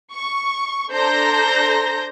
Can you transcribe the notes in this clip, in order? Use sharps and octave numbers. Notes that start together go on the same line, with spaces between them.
C#6
D4 A4 C5 A#5 G6 A#6